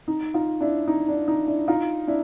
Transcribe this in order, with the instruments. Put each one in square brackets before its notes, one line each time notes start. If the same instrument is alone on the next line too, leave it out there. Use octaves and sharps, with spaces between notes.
[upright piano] D#4
D#4 F4
D4 E4
D#4
D4
D#4
D4 E4
D#4 F4
D4 E4